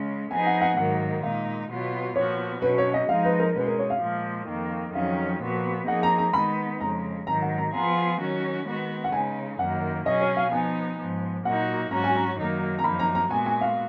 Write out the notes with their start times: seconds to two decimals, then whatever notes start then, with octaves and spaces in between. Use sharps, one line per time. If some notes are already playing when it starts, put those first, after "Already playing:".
Already playing: C#3 G#3 C#4
0.31 F3 B3 D#4 G#4 G#5
0.47 F#5
0.61 F#5
0.77 G#2 D#3 F#3 A#3 F#5
1.23 A#2 G#3 D#4 F5
1.70 B2 F#3 B3 F4
2.16 A#2 F3 B3 F#4 C#5
2.62 B2 F#3 C#4 B4
2.78 C#5
2.94 D#5
3.09 F3 G#3 D#4 F5
3.25 B4
3.40 A#4
3.56 B2 G#3 C#4 B4
3.67 A#4
3.79 C#5
3.90 F5
4.02 A#2 F3 G#3
4.48 F2 D#3 A#3
4.95 F2 D#3 F#3 C#4 F5
5.41 A#2 F3 B3 F#4
5.87 F3 A#3 D#4 G#4 F#5
6.03 A#5
6.18 A#5
6.33 D#3 G#3 B3 D#4 B5
6.80 F2 C#3 G#3 A#5
7.27 G#2 D#3 F#3 A#5
7.42 F#5
7.58 A#5
7.73 F3 B3 F4 G#4 A#5
8.20 D#3 F#3 C#4 F#4
8.66 D#3 G#3 B3 F#4
9.04 F#5
9.12 C#3 G#3 D#4 G#5
9.59 F#2 D#3 A#3 F#5
10.05 B2 F#3 C#4 G#4 D#5
10.21 C#5
10.37 F5
10.51 F3 B3 D#4 G#5
10.98 G#2 F3 B3
11.44 A#2 F#3 A#3 D#4 F#4 F#5
11.91 G#2 F#3 C#4 F#4 A#5
12.04 G#5
12.16 A#5
12.38 F#2 D#3 F#3 A#3 D#4
12.79 A#5
12.84 F#2 F3 A#3 D#4 B5
12.99 A#5
13.15 A#5
13.30 A#2 G#3 B3 F#4 G#5
13.46 G#5
13.61 F5